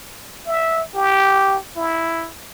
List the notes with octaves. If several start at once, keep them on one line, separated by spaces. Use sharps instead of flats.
E5
G4
E4